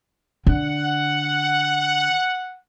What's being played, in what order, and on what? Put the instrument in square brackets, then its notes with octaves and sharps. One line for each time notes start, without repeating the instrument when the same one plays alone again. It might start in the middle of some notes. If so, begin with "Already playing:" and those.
[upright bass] D3 [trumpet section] F#5